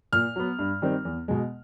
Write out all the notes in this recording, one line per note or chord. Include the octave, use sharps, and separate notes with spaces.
A#2 F6
F#3 B3
G2
D#3 G3 C4
E2
B2 G#3